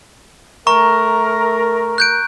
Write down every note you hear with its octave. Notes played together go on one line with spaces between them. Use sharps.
A3 A#4 A#5 C#6
F#6 G6 D7